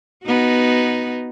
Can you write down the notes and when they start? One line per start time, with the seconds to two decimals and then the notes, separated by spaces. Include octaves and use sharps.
0.24 B3 D#4 F#4